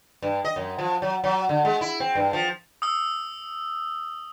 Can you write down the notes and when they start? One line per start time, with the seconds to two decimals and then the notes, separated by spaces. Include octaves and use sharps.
0.22 G2
0.45 D#5
0.56 F#2
0.78 F3
1.02 F#3
1.24 F#3
1.49 D3
1.65 G#3
1.81 E4
2.00 C4
2.15 G2
2.33 F3
2.82 D#6 E6